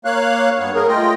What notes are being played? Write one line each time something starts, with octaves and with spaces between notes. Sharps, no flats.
A#3 C#5 F5 F#6
G2 B3 C#5
G#4 A#4
A3 F4 D#5 G5